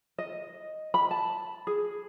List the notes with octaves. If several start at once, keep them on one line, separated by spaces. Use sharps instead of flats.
D#5
B5
A5
G#4